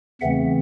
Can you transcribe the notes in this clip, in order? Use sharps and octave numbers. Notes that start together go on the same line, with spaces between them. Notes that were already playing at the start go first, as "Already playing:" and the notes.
E2 C#3 E3 A3 C4 E5 F#5